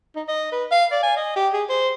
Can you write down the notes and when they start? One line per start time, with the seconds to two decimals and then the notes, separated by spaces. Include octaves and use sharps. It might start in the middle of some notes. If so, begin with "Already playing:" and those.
0.15 D#4
0.28 D#5
0.52 B4
0.71 F5
0.91 D5
1.03 G#5
1.16 D#5
1.36 G4
1.53 G#4
1.69 C5